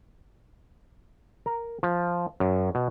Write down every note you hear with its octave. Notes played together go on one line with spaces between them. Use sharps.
A#4
F3
F#2
B2